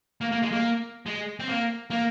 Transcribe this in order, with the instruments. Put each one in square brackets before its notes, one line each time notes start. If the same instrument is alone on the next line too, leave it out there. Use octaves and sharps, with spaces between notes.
[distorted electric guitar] A#3
A#3
G#3
A#3
G#3
C4
A#3
A#3